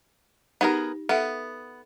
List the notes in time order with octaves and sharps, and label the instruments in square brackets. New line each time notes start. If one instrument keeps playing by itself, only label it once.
[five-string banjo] B3 G#4 A#4 [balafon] D#4 G4
[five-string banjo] B3 [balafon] A4 E5 F#5